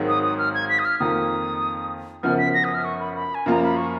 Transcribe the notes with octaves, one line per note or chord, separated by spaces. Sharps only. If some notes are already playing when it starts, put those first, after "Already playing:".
Already playing: G#1 G#2 D#3 F#3
D#6
D#6
F6
G#6
B6
D#6
F6
F2 D#3 A#3 F4 D#6
F#1 F#2 F3 B3 F6
B6
A#6
D#6
F6
C#6
B5
B5
G#5
F#2 F3 A#3 F4 A#5
B5
C#6